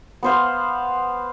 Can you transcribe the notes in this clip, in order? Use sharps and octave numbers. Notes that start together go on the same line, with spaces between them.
B3 C5 F5